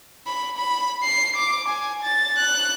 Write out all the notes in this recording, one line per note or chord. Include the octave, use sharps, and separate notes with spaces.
B5
B5
C7
D6
G#5
A6
F#6